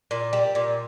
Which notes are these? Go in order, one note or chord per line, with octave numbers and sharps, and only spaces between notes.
A#2
G3
A#2